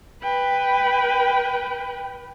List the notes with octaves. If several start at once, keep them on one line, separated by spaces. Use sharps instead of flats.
B4 G5